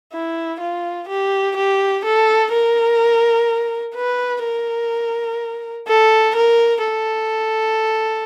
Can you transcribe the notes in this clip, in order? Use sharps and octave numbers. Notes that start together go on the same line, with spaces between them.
E4
F4
G4
G4
A4
A#4
B4
A#4
A4
A#4
A4